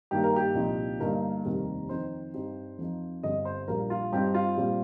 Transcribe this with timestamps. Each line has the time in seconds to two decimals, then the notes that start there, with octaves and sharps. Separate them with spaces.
0.11 G2 D#3 A#3 G4
0.23 A#4
0.36 G4
0.55 C2 A#2 F3 D#4
1.00 G1 G2 G3 A#3 D#4 A#4
1.45 F1 D#2 D#3 G3 C4
1.89 F2 D#3 C4 D#4 C5
2.34 G2 G3 C4 D#4
2.78 F2 F3 D#4
3.23 G1 G2 G3 C4 D#5
3.45 C5
3.68 A#1 A#2 G3 A#4
3.90 F4
4.12 G2 G3 C4 D#4 G4
4.34 F4
4.57 A#2 G3 C4